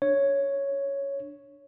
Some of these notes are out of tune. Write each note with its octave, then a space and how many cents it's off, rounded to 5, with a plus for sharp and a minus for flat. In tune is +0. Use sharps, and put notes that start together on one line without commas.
D4 +0 C#5 +0